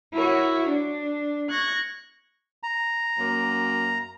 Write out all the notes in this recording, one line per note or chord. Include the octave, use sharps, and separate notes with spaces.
E4 F#4 A#4 C#5
D4
C#6 F#6 G#6 A#6
A#5
F#2 F#3 A#3